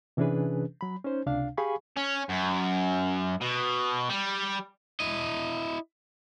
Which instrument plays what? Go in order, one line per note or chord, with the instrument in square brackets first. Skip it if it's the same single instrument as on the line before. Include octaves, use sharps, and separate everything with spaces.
[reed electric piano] C3 E3 C#4 D4 G#4 B4
F#3 B5
C#4 D#4 C5
C#2 C3 D4 F5
G4 G#4 F5 G#5 B5 C#6
[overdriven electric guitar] C#4
F#2
B2
G3
E4 D#5